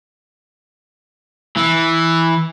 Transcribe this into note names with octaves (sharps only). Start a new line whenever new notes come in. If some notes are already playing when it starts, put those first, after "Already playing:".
E3